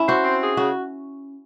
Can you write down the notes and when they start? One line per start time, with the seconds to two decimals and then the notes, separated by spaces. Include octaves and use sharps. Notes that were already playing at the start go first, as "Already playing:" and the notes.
Already playing: C#4 E4
0.08 F#4 C5
0.24 C4
0.41 G#4
0.57 C#3 F#4